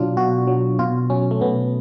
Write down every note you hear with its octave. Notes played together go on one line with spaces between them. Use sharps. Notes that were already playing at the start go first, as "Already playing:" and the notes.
Already playing: B2 F#3 D4 F4
B2 F#4
F#3
B2 F4
F#3 C#4
A3
B2 B3